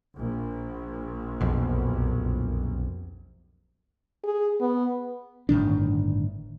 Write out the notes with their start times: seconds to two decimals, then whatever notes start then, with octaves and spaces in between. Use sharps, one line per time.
0.16 A#1
1.41 B1 F2 B2
4.24 G#4
4.60 B3
5.49 G1 A2 D#3 D4